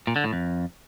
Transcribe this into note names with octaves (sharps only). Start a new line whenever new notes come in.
A#2
D3
A2
F2